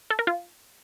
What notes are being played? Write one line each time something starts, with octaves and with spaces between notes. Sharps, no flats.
A4
A#4
F4